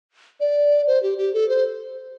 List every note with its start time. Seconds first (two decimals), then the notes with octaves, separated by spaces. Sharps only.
0.40 D5
0.87 C5
1.03 G4
1.18 G4
1.34 A4
1.49 C5